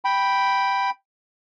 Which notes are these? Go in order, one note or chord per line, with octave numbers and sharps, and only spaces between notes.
G5 B5